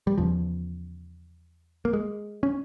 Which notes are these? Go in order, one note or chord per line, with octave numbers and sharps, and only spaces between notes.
G3
E2 C#3 F3
A#3
G#3
C#4